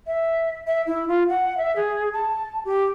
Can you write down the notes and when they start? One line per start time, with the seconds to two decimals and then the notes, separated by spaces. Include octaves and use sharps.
0.07 E5
0.67 E5
0.87 E4
1.08 F4
1.29 F#5
1.58 E5
1.76 G#4
2.13 A5
2.65 G4